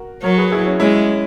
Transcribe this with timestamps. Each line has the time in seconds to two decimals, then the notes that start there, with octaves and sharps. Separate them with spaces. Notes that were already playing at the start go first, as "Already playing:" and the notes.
Already playing: F#4 A#4
0.23 F#3 A#4 C#5
0.38 G#4 B4
0.52 E4 G#4
0.67 C#4
0.80 G#3 C#4 E4